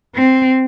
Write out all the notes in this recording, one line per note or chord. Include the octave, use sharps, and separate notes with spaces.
C4